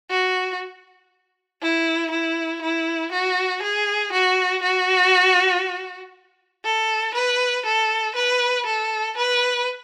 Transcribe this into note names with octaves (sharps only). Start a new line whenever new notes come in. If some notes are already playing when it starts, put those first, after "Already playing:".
F#4
E4
E4
E4
F#4
G#4
F#4
F#4
A4
B4
A4
B4
A4
B4